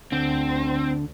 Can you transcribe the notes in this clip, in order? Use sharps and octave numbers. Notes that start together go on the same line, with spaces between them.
D2 D3 C4